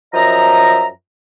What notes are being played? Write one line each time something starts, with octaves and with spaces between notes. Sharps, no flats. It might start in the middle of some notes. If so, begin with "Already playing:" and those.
F#2 F3 D#5 E5 A#5